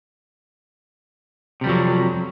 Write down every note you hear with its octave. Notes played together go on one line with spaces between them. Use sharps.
F2 C3 F#3 G3